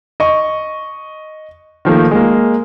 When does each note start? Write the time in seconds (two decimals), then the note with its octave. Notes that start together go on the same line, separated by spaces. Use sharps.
0.20 D#5 C#6
1.85 D#3 F3 A3 A#3
2.11 G#3 A#3